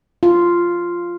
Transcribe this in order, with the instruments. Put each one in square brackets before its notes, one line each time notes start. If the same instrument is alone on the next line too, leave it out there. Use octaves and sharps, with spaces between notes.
[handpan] F4